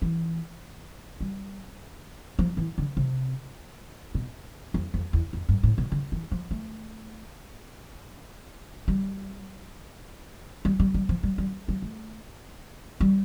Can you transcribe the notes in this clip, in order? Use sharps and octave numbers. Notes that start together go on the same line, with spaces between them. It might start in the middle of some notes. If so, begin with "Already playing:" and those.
E3
G3
F3
E3
D3
C3
B2
F2
F2
E2
F2
G2
A2
B2
D3
E3
F3
A3
G3
G3
G3
G3
F3
G3
G3
G3
A3
G3